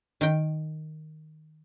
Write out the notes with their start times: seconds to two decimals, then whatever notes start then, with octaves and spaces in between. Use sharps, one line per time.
0.21 D#3 G5